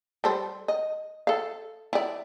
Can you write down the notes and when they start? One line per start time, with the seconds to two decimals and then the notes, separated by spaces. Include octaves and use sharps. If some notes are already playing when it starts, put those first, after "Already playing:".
0.24 G3 A4 C5
0.68 D#5
1.27 A4 F5
1.93 E4 D5